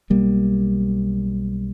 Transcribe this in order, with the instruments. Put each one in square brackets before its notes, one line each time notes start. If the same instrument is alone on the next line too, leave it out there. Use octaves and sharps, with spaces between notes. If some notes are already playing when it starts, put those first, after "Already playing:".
[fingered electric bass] B1 G3 A#3